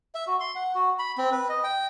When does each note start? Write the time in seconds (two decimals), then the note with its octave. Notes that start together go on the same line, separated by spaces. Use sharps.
0.15 E5
0.27 F#4
0.40 C6
0.55 F#5
0.75 F#4
0.99 B5
1.18 C4
1.32 B4
1.49 D#5
1.64 G5